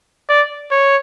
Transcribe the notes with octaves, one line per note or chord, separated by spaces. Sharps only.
D5
C#5